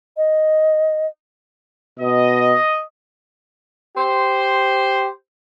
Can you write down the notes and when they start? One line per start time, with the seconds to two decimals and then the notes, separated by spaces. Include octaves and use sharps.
0.17 D#5
1.99 B2 D#5
3.96 G4 C5